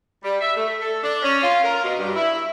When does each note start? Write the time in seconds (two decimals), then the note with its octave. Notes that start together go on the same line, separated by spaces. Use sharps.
0.24 G3
0.41 E5
0.57 A3
0.80 A4
1.03 D4
1.22 C#4
1.43 F4
1.64 A#4
1.83 B2
1.98 G2
2.15 E4